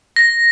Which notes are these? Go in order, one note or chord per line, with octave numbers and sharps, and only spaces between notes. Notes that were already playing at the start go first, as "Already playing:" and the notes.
A#6